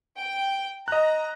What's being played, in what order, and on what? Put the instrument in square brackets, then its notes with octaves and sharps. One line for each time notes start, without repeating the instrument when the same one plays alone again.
[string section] G5
[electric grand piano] D#5 F#6 [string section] A#5